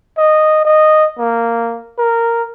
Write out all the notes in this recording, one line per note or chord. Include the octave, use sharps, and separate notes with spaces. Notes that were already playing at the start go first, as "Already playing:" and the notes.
D#5
D#5
A#3
A#4